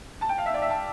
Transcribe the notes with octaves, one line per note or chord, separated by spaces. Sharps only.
A5
G5
F5
E5
D5
E5
A5